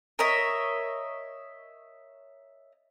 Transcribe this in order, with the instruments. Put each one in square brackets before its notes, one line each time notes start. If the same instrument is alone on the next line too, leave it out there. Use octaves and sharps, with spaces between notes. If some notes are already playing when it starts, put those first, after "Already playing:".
[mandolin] A#4 C#5 D#5 E5